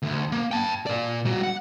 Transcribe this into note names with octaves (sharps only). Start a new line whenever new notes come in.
D2
A#3
G5 A5
A#2 D5
G3 F#4
F#5